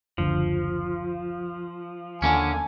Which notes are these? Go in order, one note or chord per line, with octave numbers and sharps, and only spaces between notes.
F#1 D2 D3 F3
D#2 D3 A#3 C#4 G#5